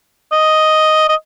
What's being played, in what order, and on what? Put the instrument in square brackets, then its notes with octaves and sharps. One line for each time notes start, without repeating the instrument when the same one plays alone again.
[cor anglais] D#5
D#5